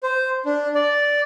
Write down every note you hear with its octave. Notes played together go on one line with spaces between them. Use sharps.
C5
D4
D5